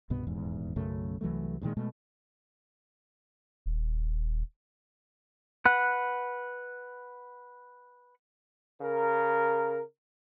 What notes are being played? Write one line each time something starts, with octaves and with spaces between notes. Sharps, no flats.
C2 G2 B2 B3
D#1 E2 G#2
B1 F#2 C#3 A3
C2 E3 F#3 A3
G2 A#2 D#3 G#3
B2 G#3 A3
D#1
B4 F#5
C#3 A#4